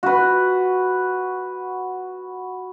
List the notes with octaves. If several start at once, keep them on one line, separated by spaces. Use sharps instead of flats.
F#4 B4